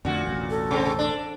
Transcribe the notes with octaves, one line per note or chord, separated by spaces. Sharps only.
F2 A#2 D3 A3 F#4
E1 A1
A4
C3 C4
D4